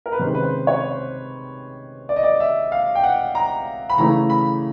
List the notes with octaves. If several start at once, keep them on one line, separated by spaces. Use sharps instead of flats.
A#4
B4
C3 D#3 G#3 C#4 C5
B4
C5
C#5
C5
D5
D#5
D5
E5
F5
G5
F#5
A#5
B5
C#3 E3 A3 C#4 A#5
B5